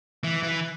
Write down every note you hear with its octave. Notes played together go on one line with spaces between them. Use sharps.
E3
E3